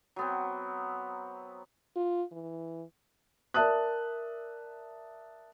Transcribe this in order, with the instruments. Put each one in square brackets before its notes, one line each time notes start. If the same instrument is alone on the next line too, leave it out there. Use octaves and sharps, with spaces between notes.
[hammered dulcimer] F#3 B3 C4
[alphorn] F4
E3
[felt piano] A#4 D5 E5 A5 D#6 F#6